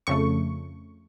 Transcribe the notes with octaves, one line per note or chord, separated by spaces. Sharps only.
F2 C#3 A3 C#6